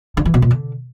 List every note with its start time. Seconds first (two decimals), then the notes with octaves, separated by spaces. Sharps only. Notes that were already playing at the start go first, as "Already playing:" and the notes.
0.17 D3
0.25 E3
0.34 B2
0.42 A#2
0.51 D3